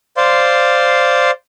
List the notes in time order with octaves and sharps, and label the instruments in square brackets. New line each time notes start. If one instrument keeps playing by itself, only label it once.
[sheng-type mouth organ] C5 D5 F5 C6